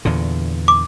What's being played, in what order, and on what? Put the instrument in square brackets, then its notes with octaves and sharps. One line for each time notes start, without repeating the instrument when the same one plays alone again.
[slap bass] E2 A#2 D3
[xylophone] D6